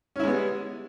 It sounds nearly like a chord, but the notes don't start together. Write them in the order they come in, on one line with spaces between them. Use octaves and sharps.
C#4 E4 G#3 B3 G3